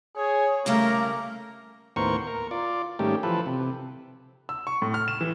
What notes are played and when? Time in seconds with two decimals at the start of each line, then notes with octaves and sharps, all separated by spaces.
0.16 G#4 C#5
0.66 C#3 G3 A3 A#3 A#4
1.96 D#2 A2 B3 A#4 C5 C#6
2.27 A#4
2.51 F4 D5
2.99 G#2 D#3 G3 A3 C#4 G4
3.23 E3 F3 A4 B4
3.46 C3
4.49 E6
4.67 C#6
4.82 A2
4.94 F6
5.08 E7
5.21 E3